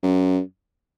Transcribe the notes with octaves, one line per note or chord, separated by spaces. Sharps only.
F#2